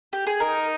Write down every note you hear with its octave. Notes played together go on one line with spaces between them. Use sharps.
G4
G#4
D#4 A#4